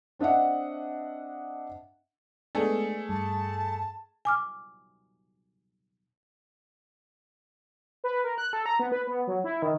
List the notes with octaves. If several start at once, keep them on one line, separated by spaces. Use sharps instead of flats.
C4 D4 D#5 E5 F#5
G#3 A3 B3 D4 G#4 A4
G2 A5
G#5 D6 F6
B4
A#4
F#6
A4
A#5
B3
B4
B3
F#3
E4
D#3